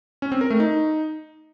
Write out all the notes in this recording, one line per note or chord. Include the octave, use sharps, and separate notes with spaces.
C#4
C4
A#4
A3
D#4